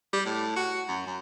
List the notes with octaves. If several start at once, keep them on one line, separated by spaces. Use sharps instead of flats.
G3
A2
F#4
F#2
F#2